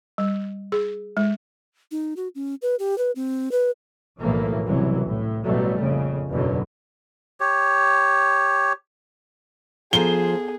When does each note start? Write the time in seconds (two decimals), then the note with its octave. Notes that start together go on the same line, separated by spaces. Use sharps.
0.18 G3
0.72 G#4
1.17 G#3
1.91 D#4
2.17 F#4
2.35 C#4
2.62 B4
2.79 G4
2.98 B4
3.16 C4
3.52 B4
4.20 B1 A2 E3 F3 A3 A#3
4.67 F#1 C2 C3 E3 F#3
5.07 A2
5.45 A1 B2 F#3 G3 A3
5.80 A#1 F2 C#3
6.31 F#1 E2 B2 D3 F#3
7.40 G4 C#5
9.93 F3 B3 G#4 A4 C5 A#5 G7